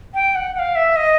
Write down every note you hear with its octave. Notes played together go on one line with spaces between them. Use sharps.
G5
F#5
F#5
F5
E5
D#5